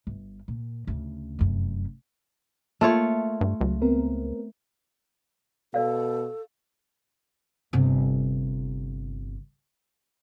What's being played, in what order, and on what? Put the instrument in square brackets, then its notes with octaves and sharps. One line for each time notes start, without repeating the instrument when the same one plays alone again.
[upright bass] G1
A#2
D2 C#3
F1 F#2
[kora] A3 F4 C#5 [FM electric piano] A#3
[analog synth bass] G2
[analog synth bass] C#2 [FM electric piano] F#3
[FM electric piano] B3 C4 A#4
[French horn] B2 [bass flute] A4 [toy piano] D5 F5
[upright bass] G1 C3